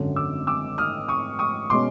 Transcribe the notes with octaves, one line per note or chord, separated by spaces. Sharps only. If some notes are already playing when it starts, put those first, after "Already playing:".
Already playing: G#1 F#2 D3
D6 E6
D6 E6
D#6 F6
C#6 D#6
C#6 D#6
B2 G#3 C#4 C6 D6